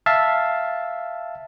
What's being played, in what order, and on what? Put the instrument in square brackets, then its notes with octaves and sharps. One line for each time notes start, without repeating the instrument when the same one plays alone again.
[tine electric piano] E5 F5 A5